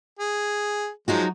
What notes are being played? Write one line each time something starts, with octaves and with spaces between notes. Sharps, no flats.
G#4
F3 F#3 G#3 D#4 F#4